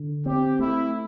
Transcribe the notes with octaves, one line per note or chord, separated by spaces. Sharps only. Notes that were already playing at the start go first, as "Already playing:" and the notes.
Already playing: D3
C4 G4
A3 E4